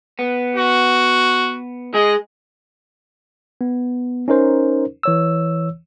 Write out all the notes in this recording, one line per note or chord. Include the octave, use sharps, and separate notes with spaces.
B3
F#4
G#3 G#4 D#5
B3
C#4 D#4 A#4 C5
E3 C#5 E6